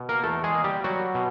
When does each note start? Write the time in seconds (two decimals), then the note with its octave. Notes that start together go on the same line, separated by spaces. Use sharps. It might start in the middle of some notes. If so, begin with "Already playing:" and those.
Already playing: B2
0.09 A#3 A#4
0.23 E2 A3 A4
0.44 G#3 G#4
0.54 A#3
0.64 G3 G4
0.84 F#3 G3 F#4
1.15 B2